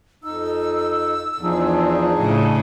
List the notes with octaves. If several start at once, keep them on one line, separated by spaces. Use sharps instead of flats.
F2 D#4 E6
E2 F3 D4 D#4 G#4
A2 C#3